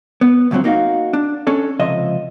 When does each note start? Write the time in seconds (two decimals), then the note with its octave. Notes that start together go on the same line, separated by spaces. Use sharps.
0.21 B3
0.51 D2 G2 A#2 F#3 C4
0.64 A#3 D#4 F#4 F5
1.13 D4
1.47 C#4 D4 A4
1.80 C#2 C3 F3 D#5 E5